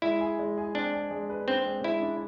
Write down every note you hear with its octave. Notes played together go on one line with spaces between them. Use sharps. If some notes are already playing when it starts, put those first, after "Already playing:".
G#3 E4
G#4
G#3
G#4
C4 D4
G#4
G#3
B4
C4 D4
G#3
G#3 E4
D4